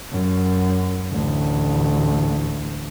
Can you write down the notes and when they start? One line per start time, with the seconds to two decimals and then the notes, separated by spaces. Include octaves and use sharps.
0.12 F#2
1.11 A1 D2